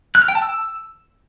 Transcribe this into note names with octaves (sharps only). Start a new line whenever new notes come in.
F#6
F6
G5
A5
E6